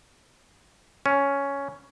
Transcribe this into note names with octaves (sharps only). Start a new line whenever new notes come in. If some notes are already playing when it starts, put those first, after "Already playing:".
C#4